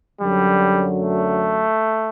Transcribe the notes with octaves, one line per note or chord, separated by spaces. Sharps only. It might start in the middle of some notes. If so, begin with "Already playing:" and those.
F#2 D3 F#3 G3
A3